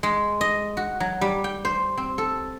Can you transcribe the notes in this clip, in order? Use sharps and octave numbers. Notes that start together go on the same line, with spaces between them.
G#3
D#5
F#4
F#3
G3
G5
C5
C4
A4